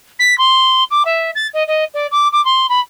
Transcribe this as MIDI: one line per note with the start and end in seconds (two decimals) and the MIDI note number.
0.19 0.36 95
0.38 0.84 84
0.91 1.03 86
1.05 1.31 76
1.35 1.48 93
1.54 1.63 75
1.68 1.85 75
1.94 2.07 74
2.12 2.28 86
2.32 2.43 86
2.45 2.69 84
2.69 2.80 83